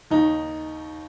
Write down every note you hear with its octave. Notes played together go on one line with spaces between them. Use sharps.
D#2 D#3 D#4